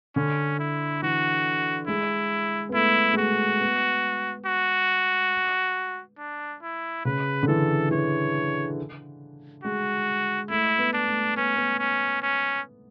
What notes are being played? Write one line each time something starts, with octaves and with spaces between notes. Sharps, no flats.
D3 C#4
E4
E3 F#4
G#3 E4
B3
A3 E4
G#3
A3 F#4
B3
F#4
D4
E4
C#3 B4
D3
E3 A4
E3 C#5
G#3 F#4
A3 E4
B3
D4
A3
B3 C#4
B3
C#4
C#4